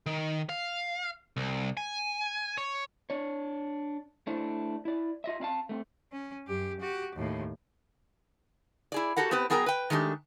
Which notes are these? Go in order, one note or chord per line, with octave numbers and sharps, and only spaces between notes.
D#3
F5
C2
G#5
C#5
D4 C#5
A3 D4 E4 C5
E4 D5
F4 D#5 E5
C4 D4 F5 A5
A3 B3 C4
C#4
F#2 G4
F#4 G4
D#2 A2
E4 G#4 D5
F#4 G4 A4 A#4 F#5
B3 C4 G4 B4
F#3 B3 G#4 A#4 G5 A#5
B4 G5
D#3 G#3 A3 D4 G4